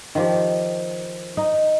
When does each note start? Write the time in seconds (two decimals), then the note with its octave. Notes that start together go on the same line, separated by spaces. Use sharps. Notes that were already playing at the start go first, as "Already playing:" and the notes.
0.15 D#3 F3 G4
1.37 D#4